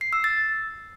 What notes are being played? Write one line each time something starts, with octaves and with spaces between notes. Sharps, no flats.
C7
E6
A6